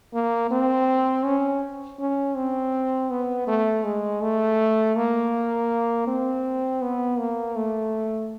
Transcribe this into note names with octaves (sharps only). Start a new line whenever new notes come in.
A#3
C4
C#4
C#4
C4
B3
A3
G#3
A3
A#3
C4
B3
A#3
A3